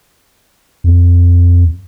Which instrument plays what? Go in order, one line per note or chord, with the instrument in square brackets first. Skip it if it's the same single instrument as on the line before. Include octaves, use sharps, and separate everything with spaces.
[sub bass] F2